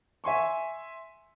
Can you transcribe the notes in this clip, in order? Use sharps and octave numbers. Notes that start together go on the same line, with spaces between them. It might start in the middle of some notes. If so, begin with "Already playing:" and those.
E5 G#5 C6 C#6